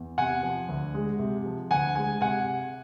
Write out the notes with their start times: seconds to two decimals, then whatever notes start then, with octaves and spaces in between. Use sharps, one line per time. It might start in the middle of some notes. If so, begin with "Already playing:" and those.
Already playing: E2
0.18 C3 F#5 G#5
0.43 F3
0.69 D2
0.94 G#3
1.19 C3
1.46 F3
1.71 D2 F#5 G#5
1.95 G#3 G#5
2.21 C3 F#5 G#5